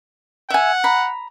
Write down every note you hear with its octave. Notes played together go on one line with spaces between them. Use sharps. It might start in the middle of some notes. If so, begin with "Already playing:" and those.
E5 F#5 G#5
A#5 B5